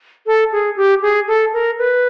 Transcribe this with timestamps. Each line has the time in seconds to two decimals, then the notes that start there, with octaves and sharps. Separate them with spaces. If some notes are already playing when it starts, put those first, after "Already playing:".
0.26 A4
0.52 G#4
0.76 G4
1.02 G#4
1.28 A4
1.53 A#4
1.78 B4